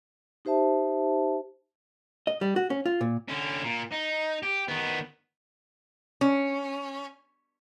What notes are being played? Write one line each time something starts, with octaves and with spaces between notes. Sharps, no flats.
D#4 G4 C5 E5 A5
D#5
G3
F#4
C#4
F4
A#2
D3 C#4
A#2
D#4
G4
D#3 B3
C#4